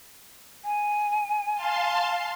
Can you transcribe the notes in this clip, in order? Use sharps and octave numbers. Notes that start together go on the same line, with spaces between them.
G#5
F5 A5 C6